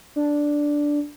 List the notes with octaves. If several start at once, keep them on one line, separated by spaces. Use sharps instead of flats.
D4